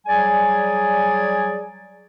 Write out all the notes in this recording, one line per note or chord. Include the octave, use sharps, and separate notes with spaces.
F#3 G3 G#4 D5 G#5